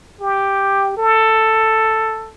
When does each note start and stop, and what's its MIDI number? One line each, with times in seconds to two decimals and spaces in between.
0.21 0.94 67
0.97 2.33 69